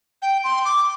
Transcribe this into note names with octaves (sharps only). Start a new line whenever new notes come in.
G5
C6
D6